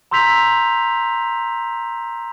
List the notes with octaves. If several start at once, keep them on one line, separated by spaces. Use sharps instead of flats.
A#5 C6 E6 G6 B6 F7